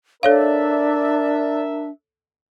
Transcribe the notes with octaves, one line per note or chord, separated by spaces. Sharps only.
D4 A4 A#4 C#5 D5 E5 F5